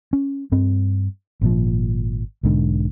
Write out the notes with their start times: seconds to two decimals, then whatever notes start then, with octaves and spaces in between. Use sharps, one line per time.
0.13 C#4
0.52 G2 C4
1.41 G#1 A#2 F3
2.43 B1 G#2 D3